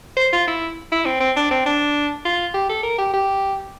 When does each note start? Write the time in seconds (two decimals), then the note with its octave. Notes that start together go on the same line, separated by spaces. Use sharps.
0.17 C5
0.33 F4
0.48 E4
0.92 E4
1.06 C4
1.20 C4
1.36 D4
1.51 C4
1.66 D4
2.25 F4
2.54 G4
2.69 A4
2.83 A#4
2.98 G4
3.14 G4